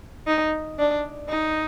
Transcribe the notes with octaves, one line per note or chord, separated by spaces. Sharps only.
D#4
D4
D#4